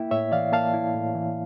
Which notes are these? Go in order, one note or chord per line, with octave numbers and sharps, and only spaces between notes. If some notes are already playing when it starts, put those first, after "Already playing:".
Already playing: A#3 E4 E5 G5
A2 C#5 E5
E3 D5 F5
A#3 F5 A5
E4
A2
E3